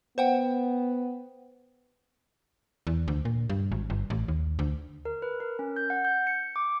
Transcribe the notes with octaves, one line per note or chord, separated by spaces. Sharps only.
B3 C5 F#5 G5
E2
D2
A#2
G2
G#1
G1
A1
D#2
D2
A#4
B4
A#4
C#4
G6
F#5
G6
C#7
D6